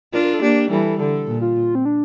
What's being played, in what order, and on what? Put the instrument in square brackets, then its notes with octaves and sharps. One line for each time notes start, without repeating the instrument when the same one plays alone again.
[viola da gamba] D4 F4 [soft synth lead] A#4
[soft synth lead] A#4
A4
[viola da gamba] A#3 D4 [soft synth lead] G4
[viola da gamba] E3 G3 [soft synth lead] A4
[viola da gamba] D3 [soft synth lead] A4
[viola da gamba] A#2
[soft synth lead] F4
C4
D4